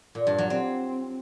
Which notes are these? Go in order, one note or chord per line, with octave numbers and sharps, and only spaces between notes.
A#2
G2
F#3
C4